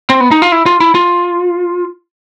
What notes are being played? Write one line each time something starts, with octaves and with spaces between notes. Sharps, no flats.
C4
B3
D#4
F4
E4
F4
E4
F4